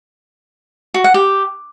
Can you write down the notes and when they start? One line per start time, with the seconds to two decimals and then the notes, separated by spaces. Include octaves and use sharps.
0.94 F#4
1.04 F#5
1.14 G4